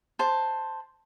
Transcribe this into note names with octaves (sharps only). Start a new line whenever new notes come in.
C5 A5